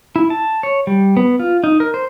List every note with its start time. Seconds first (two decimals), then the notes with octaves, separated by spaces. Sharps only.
0.16 E4
0.30 A5
0.63 C#5
0.87 G3
1.17 B3
1.39 F4
1.64 D#4
1.80 A#4
1.94 C5